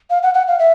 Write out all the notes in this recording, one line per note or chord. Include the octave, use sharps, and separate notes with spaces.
F5
F#5
F#5
F5
E5